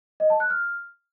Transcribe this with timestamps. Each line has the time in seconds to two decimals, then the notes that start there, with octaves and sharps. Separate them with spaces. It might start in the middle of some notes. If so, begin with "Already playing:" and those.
0.20 D#5
0.30 A5
0.40 F#6
0.50 F6